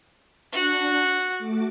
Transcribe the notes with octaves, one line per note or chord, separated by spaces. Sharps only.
D4 F#4 F#5
A3 F#4 D6